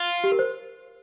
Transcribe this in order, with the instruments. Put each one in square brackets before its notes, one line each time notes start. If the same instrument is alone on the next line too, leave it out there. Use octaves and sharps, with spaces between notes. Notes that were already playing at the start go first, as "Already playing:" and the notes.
Already playing: [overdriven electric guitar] F4
[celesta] G4
A#4
C5